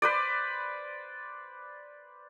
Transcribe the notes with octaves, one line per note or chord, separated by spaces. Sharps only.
B4 C5 D5